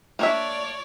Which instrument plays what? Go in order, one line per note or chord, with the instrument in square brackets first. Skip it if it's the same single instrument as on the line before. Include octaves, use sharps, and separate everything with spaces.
[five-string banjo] A#3 D4 E5 [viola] C#5 D5